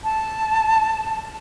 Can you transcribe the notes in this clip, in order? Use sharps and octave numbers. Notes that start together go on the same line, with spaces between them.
A5